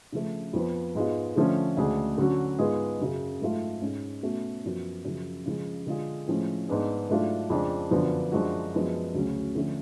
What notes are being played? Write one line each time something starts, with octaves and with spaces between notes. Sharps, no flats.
C#3 F3 A3
F2 F3 B3
G#2 G#3 B3 F4
D3 F3 A3 C#4
D2 C#3 G#3 D4 G#4
D3 F#3 C#4 F#4
G#2 G#3 B3 F4 G#4
F#2 C#3 F#3
G#2 F#3 A3 F4
G#2 G#3 C#4
B2 A3 C#4 F#4
F#2 F3 B3 F#4
F#2 C#3 F3
C#3 F3 G#3
D3 G#3 D4 F4 G#4
A2 F3 G#3 C#4
G#2 G#3 B3 D4 G#4
G#2 F#3 A3 D4 F4
F2 C#3 G#3 D4
F#2 D3 F3 B3 D4
F#2 F3 G#3 D4 F#4
F#2 F3 G#3 B3 D4
D2 C#3 F#3 C#4
D3 F3 A3 C#4